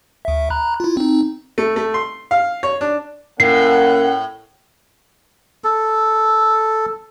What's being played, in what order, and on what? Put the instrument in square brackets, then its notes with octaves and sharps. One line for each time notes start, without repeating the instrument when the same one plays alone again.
[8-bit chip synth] D2 E5
A#5 B5 F#6
E4 F4
C4 D#4
[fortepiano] A3
A3
C6
F5
C#5
D4
[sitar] A2 [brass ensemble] A#3 C#4 F#5 [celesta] C7
[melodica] A4